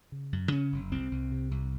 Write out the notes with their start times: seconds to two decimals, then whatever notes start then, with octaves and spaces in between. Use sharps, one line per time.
0.12 C#3
0.32 F#2
0.52 C#3 C#4
0.72 F#1
0.91 C2 C4
1.11 C2
1.32 C3
1.51 C2